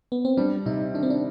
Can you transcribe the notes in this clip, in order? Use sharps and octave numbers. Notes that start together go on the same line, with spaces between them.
B3
C4
G3 D4
C3 D#4
D#3 D4
C4
D4